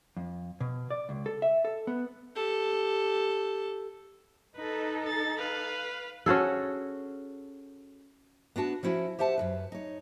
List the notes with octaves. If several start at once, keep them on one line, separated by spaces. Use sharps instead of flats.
F2
B2
D5
C#2
A4
E5
A4
B3
G4 A4
D#4 A4 B4
A6
B4 F5
C#4 F#4 G#4 A4
B3 D4 F#4 A5
F3 C#4 E4 F#4
G4 C5 E5 F#5 A5
F#2 D#3 B4
D#4 C#5